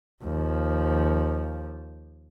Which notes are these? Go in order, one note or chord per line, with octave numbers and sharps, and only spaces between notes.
D#2 F3